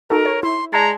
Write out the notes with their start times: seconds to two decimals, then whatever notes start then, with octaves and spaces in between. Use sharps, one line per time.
0.10 D#4 F#4 A4 A#4
0.25 C#5
0.43 E4 C6
0.73 G#3 D5 A5 A#5 G#6